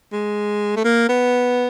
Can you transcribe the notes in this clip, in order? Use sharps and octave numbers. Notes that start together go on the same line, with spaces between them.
G#3
A3
A#3
B3